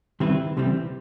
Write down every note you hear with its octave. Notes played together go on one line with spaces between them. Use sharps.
D#3 G3 C4 E4 B4
C2 C3 E3 G3 C4